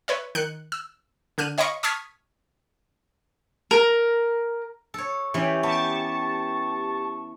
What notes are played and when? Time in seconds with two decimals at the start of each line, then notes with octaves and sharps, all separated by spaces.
0.08 B4 C#5 E5
0.35 D#3 F#6 C#7
0.72 E6
1.38 D3 F6 F#6 D#7
1.58 C#5 D#5 F5 B5 C#6
1.83 A5 C#6 D#6 F6 G#6 B6
3.71 A#4
4.94 A4 C#5
5.34 E3 C#4 G4
5.63 B3 G4 A5 C#6